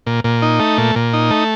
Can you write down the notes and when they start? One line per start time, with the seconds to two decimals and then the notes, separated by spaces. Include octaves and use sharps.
0.06 A#2
0.24 A#2
0.42 D#4
0.60 A3
0.77 A#2
0.95 A#2
1.13 D#4
1.31 A3